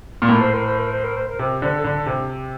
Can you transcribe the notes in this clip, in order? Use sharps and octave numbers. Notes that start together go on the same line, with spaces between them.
A#2
A2 A#4
C5
A#4
C5
A#4
C5
A#4
C5
A#4
C3
D3 C5
A4
D3
C3